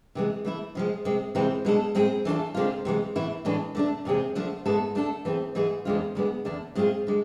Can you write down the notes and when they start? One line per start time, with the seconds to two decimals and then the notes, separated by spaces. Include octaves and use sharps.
0.15 C3 E3 G#3
0.45 E3 A3 E4
0.75 C3 F3 G#3
1.05 C3 G#3 C4
1.35 C3 E3 G#3 C4 E4
1.65 B2 G#3 D4 A4
1.95 A2 G#3 C4 G#4
2.25 E3 A3 D4 F4 A4
2.55 D2 D3 G#3 C4 F4
2.85 C3 E3 G#3
3.15 A2 E3 A3 E4
3.45 A2 E3 G#3 D4 G#4
3.75 D3 A3 D4
4.05 E2 C3 G#3 C4 G#4
4.35 D3 F3 A3 D4
4.65 G#2 G#3 B3 E4 A4
4.95 D3 A3 D4 A4
5.25 E3 A3 C4 G#4
5.55 G#2 E3 A3 E4 G#4
5.85 E2 D3 G#3 C4 F4
6.15 D2 D3 G#3 B3
6.45 E2 D3 A3 D4
6.75 A2 G#3 C4 F4 G#4
7.07 D3 G#3